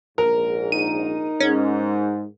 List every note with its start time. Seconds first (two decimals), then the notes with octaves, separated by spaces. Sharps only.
0.18 A#1 G#2 A#4
0.72 D#4 D#7
1.40 G#2 C#4